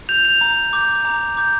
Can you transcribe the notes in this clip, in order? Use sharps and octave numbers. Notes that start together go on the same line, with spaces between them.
G6 F7
F7
A#5
D6 G6
A#5
D6 G6